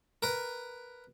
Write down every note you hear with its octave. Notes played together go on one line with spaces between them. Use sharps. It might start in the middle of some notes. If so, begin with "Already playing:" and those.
A#4 B4